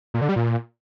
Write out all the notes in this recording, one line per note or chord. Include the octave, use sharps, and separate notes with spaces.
A#2
D3
G3
A#2